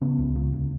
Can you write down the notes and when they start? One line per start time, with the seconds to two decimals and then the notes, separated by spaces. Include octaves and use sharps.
0.01 C#3 B3
0.18 C#2
0.36 C#3
0.53 D2